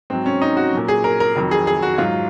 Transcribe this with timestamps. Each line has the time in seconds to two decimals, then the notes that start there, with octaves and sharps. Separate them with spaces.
0.10 G#2 F#3 C4
0.26 C#4
0.42 D#4
0.57 F#4
0.73 A#2 F#3
0.88 G#4
1.04 A#4
1.20 A#4
1.36 F2 D#3 F#3
1.51 G#4
1.67 G#4
1.82 F#4
1.98 G#2 F#3 F4